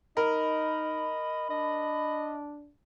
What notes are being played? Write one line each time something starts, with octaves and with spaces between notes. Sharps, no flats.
D#4 A#4 D#5 B5
D4 D#5